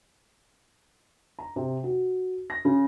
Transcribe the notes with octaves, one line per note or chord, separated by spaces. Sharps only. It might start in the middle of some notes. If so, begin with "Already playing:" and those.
A#5
C3
F#4
A#6
C#3